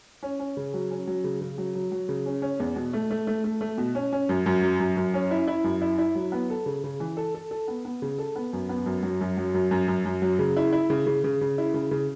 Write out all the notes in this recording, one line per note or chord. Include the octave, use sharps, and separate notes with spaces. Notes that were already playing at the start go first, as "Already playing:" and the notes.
C#4
C#4
C#3
F#3
C#4
F#3
C#3
C#3
F#3
F#3
F#3
C#3
C#4
C#4
E2
B2
A3
A3
A3
A3
A3
B2
C#4
C#4
F#2
F#2
F#3
F#2
F#2
C#4
E4
E4
F#2
E4
E4
F#3
B3
A4
C#3
C#3
E3
A4
A4
A4
B3
B3
C#3
A4
B3
F#2
B3
F#2
F#3
F#2
F#3
F#2
F#2
F#2
F#2
F#3
C#3
E4
E4
C#3
C#3
C#3
C#3
E4
C#3
C#3